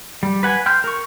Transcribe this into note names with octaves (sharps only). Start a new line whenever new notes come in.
G3
B4 F#5 G#5
G5 C6 F6 G6
A#4 C#6